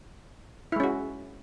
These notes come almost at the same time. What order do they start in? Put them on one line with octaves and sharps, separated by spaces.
E4 G#3 C#4 F#4